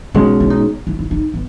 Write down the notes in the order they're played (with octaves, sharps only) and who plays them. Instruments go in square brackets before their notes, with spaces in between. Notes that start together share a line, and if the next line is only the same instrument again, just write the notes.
[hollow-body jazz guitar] B2 G#3 C#4 [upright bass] D#4
[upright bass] E4
D#4
E4
E4
D#4
B3